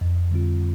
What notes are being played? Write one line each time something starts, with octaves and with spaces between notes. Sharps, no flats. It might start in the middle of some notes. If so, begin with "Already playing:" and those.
F2
D3 G3 C4 F4